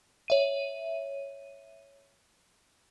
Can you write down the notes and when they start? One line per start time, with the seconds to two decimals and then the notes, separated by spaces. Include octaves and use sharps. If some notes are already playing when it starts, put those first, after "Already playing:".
0.28 C#5 E5 D#7